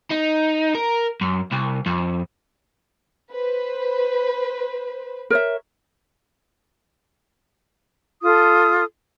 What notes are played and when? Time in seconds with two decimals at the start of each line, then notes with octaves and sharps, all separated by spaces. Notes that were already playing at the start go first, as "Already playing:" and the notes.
0.11 D#4
0.75 A#4
1.21 F#2
1.51 C2
1.86 F2
3.31 B4 C5
5.30 A#4 C#5 E5
8.23 F4 A4 D#6